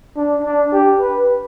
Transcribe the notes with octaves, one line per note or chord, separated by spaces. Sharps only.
D4
D4
G4
B4